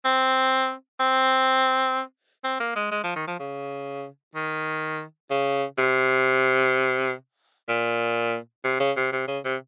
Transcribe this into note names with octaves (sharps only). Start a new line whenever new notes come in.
C4
C4
C4
A#3
G#3
G#3
F3
D#3
F3
C#3
D#3
C#3
C3
A#2
C3
C#3
C3
C3
C#3
C3